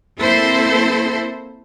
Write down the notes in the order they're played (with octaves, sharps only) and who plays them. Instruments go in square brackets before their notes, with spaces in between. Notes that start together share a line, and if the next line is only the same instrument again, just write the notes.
[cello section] A#3 C4 E4 A4 C5